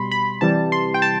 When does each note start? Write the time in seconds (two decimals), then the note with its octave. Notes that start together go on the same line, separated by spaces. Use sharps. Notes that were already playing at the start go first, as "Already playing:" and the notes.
Already playing: B2 G3 B5 C6
0.12 B5
0.41 C3 E3 G3 A5
0.72 C6
0.94 G5
1.02 A5